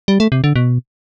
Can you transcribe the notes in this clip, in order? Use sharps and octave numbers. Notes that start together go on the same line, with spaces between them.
G3
A3
C3
D3
B2